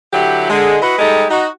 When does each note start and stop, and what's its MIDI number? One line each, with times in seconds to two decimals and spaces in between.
0.13 0.47 50
0.13 0.47 54
0.13 0.47 64
0.13 0.47 67
0.49 0.77 50
0.49 0.77 56
0.82 0.96 64
0.82 0.96 66
0.82 0.96 71
0.82 0.96 75
0.98 1.24 55
0.98 1.24 56
0.98 1.24 63
0.98 1.24 67
0.98 1.24 69
1.30 1.48 63
1.30 1.48 66